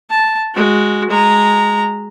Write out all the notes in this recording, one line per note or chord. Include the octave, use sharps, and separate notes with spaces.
A5
G#3 F#4
G#3 A#5